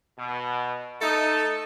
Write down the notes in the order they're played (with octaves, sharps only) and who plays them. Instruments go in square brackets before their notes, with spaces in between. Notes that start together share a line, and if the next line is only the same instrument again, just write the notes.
[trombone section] B2
[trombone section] A3 D#4 [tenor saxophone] A4